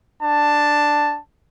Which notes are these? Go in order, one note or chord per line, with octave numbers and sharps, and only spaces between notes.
D4 A5